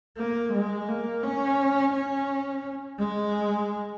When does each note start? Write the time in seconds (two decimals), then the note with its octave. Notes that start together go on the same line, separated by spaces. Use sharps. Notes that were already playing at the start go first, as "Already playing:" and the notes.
0.17 A#3
0.53 G#3
0.88 A#3
1.23 C#4
1.94 C#4
3.00 G#3